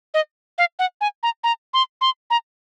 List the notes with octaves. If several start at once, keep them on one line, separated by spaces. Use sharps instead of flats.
D#5
F5
F#5
G#5
A#5
A#5
C6
C6
A#5